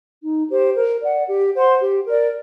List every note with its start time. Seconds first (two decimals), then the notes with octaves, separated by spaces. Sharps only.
0.23 D#4
0.50 G4 C5
0.75 A#4
1.02 D5 F#5
1.28 G4
1.54 C5 F#5 C6
1.80 G4
2.06 A#4 D5